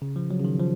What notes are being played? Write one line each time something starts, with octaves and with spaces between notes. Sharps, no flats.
C#3
F3
F#3
C#3
D#3
F3